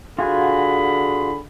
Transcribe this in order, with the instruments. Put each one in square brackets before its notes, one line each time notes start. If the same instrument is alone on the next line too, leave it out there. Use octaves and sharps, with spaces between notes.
[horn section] D3 G#4 B5 [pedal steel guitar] F4 F#4 G#5